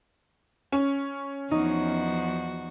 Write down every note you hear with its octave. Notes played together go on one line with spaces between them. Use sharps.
C#4
E2 F3 D#4 F#4